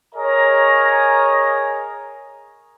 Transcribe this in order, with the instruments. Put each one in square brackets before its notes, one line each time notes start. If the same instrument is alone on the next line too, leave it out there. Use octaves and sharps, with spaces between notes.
[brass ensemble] G#4 A#4 C#5 D#5 G#5 A#5